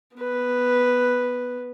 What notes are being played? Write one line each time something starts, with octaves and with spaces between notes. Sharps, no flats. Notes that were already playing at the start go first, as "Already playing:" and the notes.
B3 B4